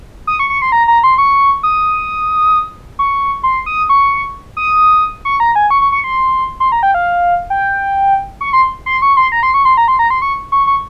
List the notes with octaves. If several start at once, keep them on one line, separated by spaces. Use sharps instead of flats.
D#6
C#6
C#6
C6
A#5
A#5
C6
C#6
D#6
C#6
C6
D#6
C#6
D#6
C#6
A#5
G#5
C#6
C#6
C#6
C6
C6
A#5
G5
F5
G5
C#6
C6
C6
C#6
C6
A#5
C6
C#6
C6
A#5
C6
A#5
C6
C#6
C#6
C#6